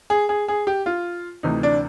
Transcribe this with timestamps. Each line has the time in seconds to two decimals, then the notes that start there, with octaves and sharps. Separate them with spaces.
0.10 G#4
0.29 G#4
0.48 G#4
0.67 G4
0.86 F4
1.43 D2 C3 E3 D#4
1.63 D4